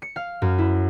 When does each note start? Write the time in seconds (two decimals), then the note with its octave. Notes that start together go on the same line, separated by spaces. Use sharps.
0.02 C#7
0.16 F5
0.42 F#2
0.58 E4